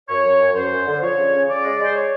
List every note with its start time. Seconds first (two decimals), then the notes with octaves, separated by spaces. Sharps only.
0.09 F#2 C#5
0.25 F#2
0.40 F#2
0.55 F#2 C5
0.71 F#2
0.86 D3
1.02 F3 C#5
1.17 C#3
1.32 C#3
1.48 C#3 D5
1.64 G#3
1.79 G#3
1.85 C5
1.94 C#5